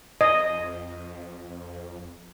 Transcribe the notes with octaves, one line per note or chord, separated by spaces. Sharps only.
F2 D#5